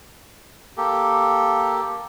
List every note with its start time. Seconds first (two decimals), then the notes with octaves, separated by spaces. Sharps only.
0.77 A#3 G4 A4